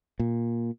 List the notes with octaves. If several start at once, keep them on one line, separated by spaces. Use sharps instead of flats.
A#2